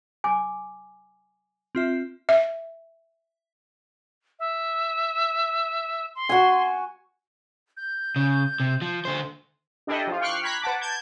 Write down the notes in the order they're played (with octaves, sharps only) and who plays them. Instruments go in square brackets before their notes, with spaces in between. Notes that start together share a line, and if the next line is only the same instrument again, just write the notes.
[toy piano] G#5 D6
[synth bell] C4 F4 E5
[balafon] E5
[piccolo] E5
C6
[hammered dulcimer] F#4 G#5
[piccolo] G6
[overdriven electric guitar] C#3
C3
F3
D3 C5
[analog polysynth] D4 E4 G4 A4 D#5
F3 F4
G5 C#6 D6 F6 F#6 C7
A#5 B5 F#6 G#6 B6
B4 F#5 A5 D6
A5 G6 G#6